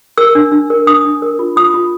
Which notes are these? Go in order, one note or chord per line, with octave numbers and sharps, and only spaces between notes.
A#4 E6
D4
D4
A#4
D4 D#6
D4
A#4
F4
F4 D#6
F4